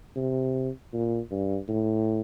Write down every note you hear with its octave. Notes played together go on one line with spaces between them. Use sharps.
C3
A#2
G2
A2